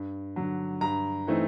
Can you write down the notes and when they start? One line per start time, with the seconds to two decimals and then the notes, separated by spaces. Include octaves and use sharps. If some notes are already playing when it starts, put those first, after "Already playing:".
Already playing: G2
0.36 D3 F#3
0.81 G2 A#5
1.27 E3 A3 C4 D#4